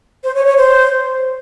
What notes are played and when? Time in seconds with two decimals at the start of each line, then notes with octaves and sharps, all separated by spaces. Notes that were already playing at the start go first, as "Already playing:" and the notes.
0.24 C5
0.35 C#5
0.45 C#5
0.56 C5